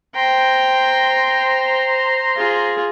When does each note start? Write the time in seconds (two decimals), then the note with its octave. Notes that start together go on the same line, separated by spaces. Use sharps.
0.16 C5 G5 A#5 C6
2.37 F4 G#4